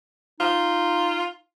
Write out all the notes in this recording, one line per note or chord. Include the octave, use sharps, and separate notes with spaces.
D#4 F4